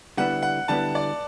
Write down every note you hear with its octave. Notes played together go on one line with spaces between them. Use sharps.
D3 G3 B3 E4 F#5
F#5
D3 G3 B3 E4 A5
D5